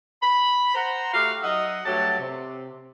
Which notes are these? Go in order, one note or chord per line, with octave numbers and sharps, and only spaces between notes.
B5
C5 F#5 A#5
A3 F#4 G4 F5
F#3 D#4 D#5 E5 F#5
G2 F#3 A3 F#4 G4 A5
C3